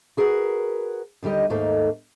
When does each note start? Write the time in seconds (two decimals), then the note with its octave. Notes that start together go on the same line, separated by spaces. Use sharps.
0.17 F#4 G#4 A#4 B4 F#5
1.23 D#2 D3 G3 G4 D#5
1.50 D#2 G#2 A3 A#3 D#4 A4